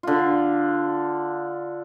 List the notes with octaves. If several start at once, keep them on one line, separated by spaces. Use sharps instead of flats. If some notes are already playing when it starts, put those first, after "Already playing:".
D3 F4